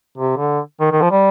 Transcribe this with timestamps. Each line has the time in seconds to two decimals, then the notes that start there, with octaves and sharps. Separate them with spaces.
0.17 C3
0.37 D3
0.80 D#3
0.92 D#3
1.02 F3
1.11 G3